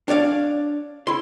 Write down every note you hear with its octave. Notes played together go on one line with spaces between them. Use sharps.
D4 C#5 D5 F5
E4 C6